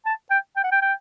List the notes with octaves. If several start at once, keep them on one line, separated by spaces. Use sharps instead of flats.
A5
G5
G5
F#5
G5
G5